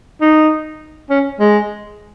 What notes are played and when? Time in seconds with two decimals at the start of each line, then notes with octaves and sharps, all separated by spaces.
0.21 D#4
1.10 C#4
1.40 G#3